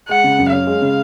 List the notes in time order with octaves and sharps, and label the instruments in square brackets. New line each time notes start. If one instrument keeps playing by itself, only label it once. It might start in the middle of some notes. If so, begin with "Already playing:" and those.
[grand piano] G#3 [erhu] F#5
[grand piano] C#3
F#2
[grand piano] C#4 [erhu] F5
[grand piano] G#3
C#3